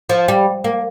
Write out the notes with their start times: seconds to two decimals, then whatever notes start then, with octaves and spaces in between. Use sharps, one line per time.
0.09 F3
0.28 G3
0.64 A#3